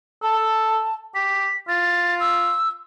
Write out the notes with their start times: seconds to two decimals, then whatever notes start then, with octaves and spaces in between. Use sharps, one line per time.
0.22 A4 A5
1.15 G4 B6
1.69 F4 A6
2.20 E6